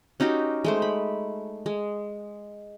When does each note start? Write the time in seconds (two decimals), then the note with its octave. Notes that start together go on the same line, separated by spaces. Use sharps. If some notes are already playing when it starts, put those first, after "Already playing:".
0.20 C#4 D#4 F#4 G4
0.64 G#3 A3 C5
0.82 B5
1.66 G#3